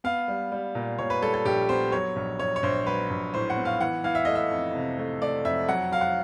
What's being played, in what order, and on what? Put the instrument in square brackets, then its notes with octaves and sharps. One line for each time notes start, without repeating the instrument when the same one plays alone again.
[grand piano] B3 F5
G3
G3
A#2
A#2 C#5
B4
G3 A4
A4
A#1 G4
B3 C5
F#3 C#5
A#1
A#1 C#5
C#5
A#1 C5
F#3 B4
A#1
A2 C5
F#5
B3
F5
E3 F#5
E3 F5
E5
A3 D#5
E5
F2
C3
A3
A3 D5
F2 E5
F#3 F#5
F#3 F5
F#5